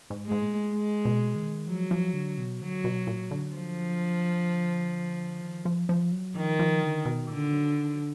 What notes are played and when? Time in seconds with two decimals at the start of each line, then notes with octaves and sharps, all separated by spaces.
0.10 G#2
0.26 G#3
0.31 G#2
0.42 A#2
0.74 G#3
1.05 B2
1.36 D#3
1.67 F3 F#3
1.91 F3
2.14 D3
2.38 B2
2.61 D3 F#3
2.84 B2
3.07 A#2
3.31 D3
3.54 F3
5.41 D#3
5.65 F3
5.89 F3
6.12 F#3
6.36 D#3 F3
6.59 F3
6.83 D3
7.05 B2
7.29 A#2 D3
7.53 F#3
7.76 D#3
7.94 F#3